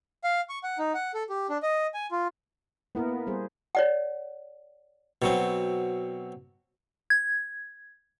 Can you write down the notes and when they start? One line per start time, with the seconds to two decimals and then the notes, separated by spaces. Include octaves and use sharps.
0.24 F5
0.49 C#6
0.63 F#5
0.78 D#4
0.94 F#5
1.14 A4
1.29 G4
1.49 D4
1.63 D#5
1.94 G#5
2.11 F4
2.95 A#3 B3 E4 A#4
3.27 G3 G#4 C5
3.75 C#5 D5 F#5
5.22 B2 F#3 C4
7.10 G#6